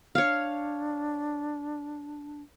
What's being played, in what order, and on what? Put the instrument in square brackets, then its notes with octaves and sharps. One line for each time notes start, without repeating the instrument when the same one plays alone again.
[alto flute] D4 [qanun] C#5 F5